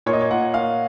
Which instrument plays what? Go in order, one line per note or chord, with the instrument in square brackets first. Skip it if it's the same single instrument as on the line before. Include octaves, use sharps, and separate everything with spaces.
[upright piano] A#2 C#5
D#5
C#5
A#2 F#5
A#2 F5